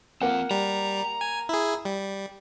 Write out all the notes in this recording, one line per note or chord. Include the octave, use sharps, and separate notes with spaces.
A#3 C4 F4 F#5
G3 A#5
G#5
E4 G#4
G3